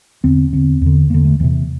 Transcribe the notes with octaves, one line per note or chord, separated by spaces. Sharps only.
E2 D3 C4
E2 D3 C4
E2 D3
E2 D3 A#3
A3
E2 C3 E3